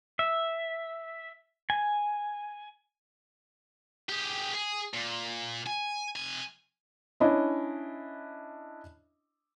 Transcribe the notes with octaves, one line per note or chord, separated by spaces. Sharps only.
E5
G#5
G4 G#4
G#4
A#2
G#5
C3 G#5
C#4 D4 E4 D#5